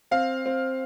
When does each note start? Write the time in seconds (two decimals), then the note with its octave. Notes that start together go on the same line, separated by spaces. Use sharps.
0.11 C4 F5
0.46 C4